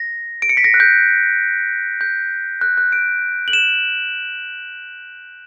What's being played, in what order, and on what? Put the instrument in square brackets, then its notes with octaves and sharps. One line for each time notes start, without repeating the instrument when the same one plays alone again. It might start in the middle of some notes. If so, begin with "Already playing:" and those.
Already playing: [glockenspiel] A#6
D7
C#7
B6
A#6
F#6
G6
G6
F#6
F#6
D7
F#7
E7